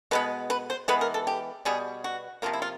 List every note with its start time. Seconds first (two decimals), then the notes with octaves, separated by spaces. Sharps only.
0.11 B2 G#3 B3 B4
0.50 B4
0.70 C5
0.88 E3 G#3 B3 B4
1.01 A#4
1.14 A4
1.27 G4
1.65 B2 G3 B3 G#4
2.04 F#4
2.42 C3 F3 A#3 F4
2.53 E4
2.62 F4